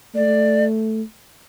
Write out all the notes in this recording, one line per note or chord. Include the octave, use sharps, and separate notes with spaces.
A3 D5